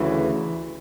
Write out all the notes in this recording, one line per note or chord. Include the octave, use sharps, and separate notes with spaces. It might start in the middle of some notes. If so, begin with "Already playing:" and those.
Already playing: D2 C#3 E3